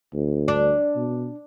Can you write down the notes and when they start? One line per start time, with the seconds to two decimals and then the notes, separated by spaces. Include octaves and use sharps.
0.13 D2
0.48 D4
0.96 B2